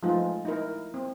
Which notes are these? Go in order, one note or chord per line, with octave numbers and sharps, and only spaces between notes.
F3 G#3 A3 D#4 F4
D#4 E4 A#4
C4